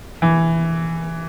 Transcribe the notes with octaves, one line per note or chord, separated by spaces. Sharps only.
E3